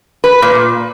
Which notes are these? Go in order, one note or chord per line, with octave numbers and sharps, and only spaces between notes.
B4
A#2